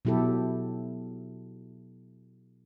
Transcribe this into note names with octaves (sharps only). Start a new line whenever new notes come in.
B2 F#3 E4 G4 A4